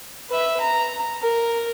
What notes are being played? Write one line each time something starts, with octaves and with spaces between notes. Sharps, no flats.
B4 E5
A#5
A#4